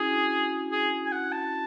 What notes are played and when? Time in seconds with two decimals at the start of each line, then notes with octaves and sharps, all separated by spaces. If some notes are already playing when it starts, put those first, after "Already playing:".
Already playing: C#4 E4 F#4 G#4
0.13 D4 F#4
0.72 G#4
1.06 G#5
1.12 F#5
1.32 A5